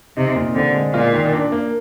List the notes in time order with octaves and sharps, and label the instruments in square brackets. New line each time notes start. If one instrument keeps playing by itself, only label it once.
[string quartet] C3 [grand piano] D#4
[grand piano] A#2
[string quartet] D3 [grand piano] C4
[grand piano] G#3
[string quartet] A#2 [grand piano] F4
[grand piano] D#3
D4
A#3